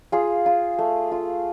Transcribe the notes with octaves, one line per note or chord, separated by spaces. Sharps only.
F4 G#4
F4
A3
F4